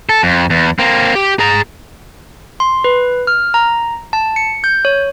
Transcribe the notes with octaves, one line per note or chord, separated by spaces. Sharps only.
A4
F2
E2
A#3 C4
G4
G#4 A#5
C6
B4
F6
A#5
A5
C#7
G6
C#5